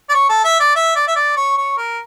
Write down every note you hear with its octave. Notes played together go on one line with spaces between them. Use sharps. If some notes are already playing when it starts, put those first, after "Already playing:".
D5
C#5
A4
E5
D5
E5
D5
E5
D5
C#5
C#5
A#4